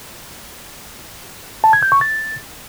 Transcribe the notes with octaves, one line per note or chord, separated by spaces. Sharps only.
A5
G#6
G6
C#6
A6